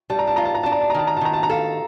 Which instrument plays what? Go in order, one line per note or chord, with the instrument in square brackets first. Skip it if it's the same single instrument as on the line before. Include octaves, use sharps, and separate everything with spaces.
[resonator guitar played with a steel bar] G3 [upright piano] A5
[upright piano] A#5
A5
[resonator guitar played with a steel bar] F4 [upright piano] A#5
[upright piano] A5
A#5
[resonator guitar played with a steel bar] D4 [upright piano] A5
[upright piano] A#5
A5
A#5
[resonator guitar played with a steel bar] D#3 [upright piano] A5
[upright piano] A#5
A5
[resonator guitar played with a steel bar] D#3 [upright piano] A#5
[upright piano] A5
A#5
[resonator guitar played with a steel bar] A4 [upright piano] F5 A5